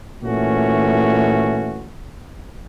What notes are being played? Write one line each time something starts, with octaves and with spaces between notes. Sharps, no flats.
A#2 E3 A3 C#4 F#4